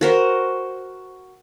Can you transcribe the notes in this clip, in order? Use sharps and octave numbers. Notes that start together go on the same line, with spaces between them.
F#4 A#4 C5